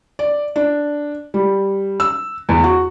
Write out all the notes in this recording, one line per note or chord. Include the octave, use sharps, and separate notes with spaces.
D5
D4
G3
E6
E2
F#4